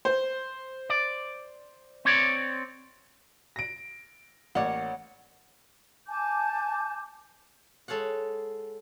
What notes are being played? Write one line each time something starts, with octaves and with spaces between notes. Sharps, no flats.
C5
D5
C4 C#5 D5
A#6 D7
A1 A#3 C#5 D5 F#5
G#5 A5 D6 G6
G#3 A4 C#5 F5 F#5